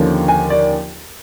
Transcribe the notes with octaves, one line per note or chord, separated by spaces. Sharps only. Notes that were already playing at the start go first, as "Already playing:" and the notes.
Already playing: D#2 D3 F3 A#3 C#4
G#5
D5